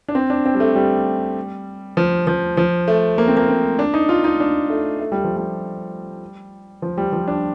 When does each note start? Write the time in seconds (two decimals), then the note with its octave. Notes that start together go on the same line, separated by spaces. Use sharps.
0.08 D4
0.15 C4
0.30 D4
0.46 C4
0.55 G3
0.60 A3
0.76 G3
1.97 F3
2.27 F3
2.57 F3
2.88 A3
3.18 A#3
3.28 C4
3.37 A#3
3.49 C4
3.79 D4
3.94 D#4
4.09 F4
4.24 D#4
4.40 D4
4.70 A3
5.00 A3
5.12 G3
5.24 F3
5.37 G3
6.82 F3
6.98 G3
7.13 F3
7.28 D4